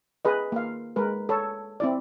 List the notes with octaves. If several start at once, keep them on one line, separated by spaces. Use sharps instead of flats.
G#4 B4 D#5
A#3 F5
G#3 A#4 B4
A4 C#5
C4 E4 D5